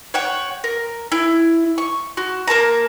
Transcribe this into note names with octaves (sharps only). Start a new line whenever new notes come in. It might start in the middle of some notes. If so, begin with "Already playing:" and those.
C#5 F#5 G5 C#6
A#4
E4
C#6
F#4
A#3 A#4 A5 A#5